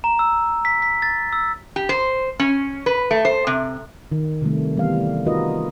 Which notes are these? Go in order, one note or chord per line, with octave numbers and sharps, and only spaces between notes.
A#5
E6
B6
B6
A6
E6
G4
C5
C#4
B4
A3
C5
C3
D#3
C3 D#3 G3 A3
E3 G3 B3 F5
A3
D#4 F4 F#4 A#4 B4 D#5